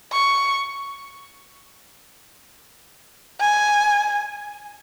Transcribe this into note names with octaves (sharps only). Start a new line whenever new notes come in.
C#6
G#5